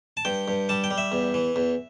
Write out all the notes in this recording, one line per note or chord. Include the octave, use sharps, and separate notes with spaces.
A5
G2 G5
G2
G3 A5
G5
G3
E5
E2
E3
E2